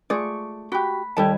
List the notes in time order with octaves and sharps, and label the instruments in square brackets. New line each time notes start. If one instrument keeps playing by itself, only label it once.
[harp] A3 C#6 [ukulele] F4 G#4 D5
[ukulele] F#4 G4 [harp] B5 F#6
[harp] D#2 G3 G#6 [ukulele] G4 A4 A5